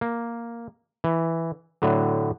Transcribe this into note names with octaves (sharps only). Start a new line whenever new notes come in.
A#3
E3
A2 D3 F#3